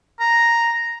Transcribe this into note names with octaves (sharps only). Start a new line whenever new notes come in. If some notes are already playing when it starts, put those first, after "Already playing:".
A#5